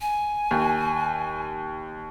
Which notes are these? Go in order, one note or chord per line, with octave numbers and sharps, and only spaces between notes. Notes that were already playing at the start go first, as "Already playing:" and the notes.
G#5
D#2